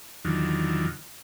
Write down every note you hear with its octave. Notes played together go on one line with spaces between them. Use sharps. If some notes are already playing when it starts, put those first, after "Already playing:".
E2 D3 D#3 F3 F#3